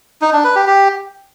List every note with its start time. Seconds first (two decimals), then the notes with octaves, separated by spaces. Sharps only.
0.22 D#4
0.33 D4
0.44 B4
0.56 G4
0.67 G4